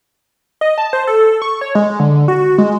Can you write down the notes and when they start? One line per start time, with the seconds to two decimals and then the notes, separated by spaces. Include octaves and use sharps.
0.61 D#5
0.78 A5
0.93 C5
1.07 A4
1.42 C#6
1.61 C#5
1.75 G#3
1.99 D3
2.28 F#4
2.58 G#3